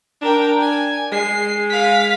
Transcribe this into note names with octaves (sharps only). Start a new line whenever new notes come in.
D4 A#4 G5
G#5
G#3 C7
F5 B6